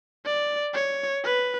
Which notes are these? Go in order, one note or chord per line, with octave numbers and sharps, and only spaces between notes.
D5
C#5
B4